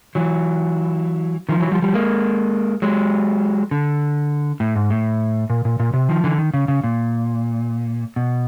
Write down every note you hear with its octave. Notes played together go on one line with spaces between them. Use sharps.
E3 F#3
D#3 F3
E3 F#3
F3 G3
F3 G3
G#3 A#3
F#3 G#3
D3
A2
G#2
A2
A#2
A#2
A#2
C3
D#3 F3
D3 E3
D#3
C#3
C#3
A#2
B2